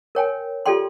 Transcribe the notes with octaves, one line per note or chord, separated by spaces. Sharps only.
A#4 C#5 G5 G#5
F4 G4 A4 D5 G5 C6